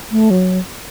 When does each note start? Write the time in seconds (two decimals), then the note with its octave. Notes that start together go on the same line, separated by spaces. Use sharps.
0.12 A3
0.30 F#3